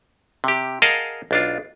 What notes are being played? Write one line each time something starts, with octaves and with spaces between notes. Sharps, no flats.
C3 G4
G#4 A#4 D#5 F5 F#5 A5
B1 D4 F4